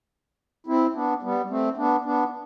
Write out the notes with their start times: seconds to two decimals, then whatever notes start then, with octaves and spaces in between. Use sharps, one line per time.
0.67 C4 E4
0.95 B3 D4
1.22 G3 B3
1.50 A3 C4
1.77 B3 D4
2.05 B3 D4